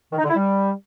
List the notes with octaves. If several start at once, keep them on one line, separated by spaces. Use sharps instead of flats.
D#3
D#4
D3
E4
G3